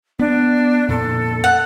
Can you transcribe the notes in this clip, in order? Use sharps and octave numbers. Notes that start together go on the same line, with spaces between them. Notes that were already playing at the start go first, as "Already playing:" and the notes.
B3 D4
F2 A#2 A4
F#5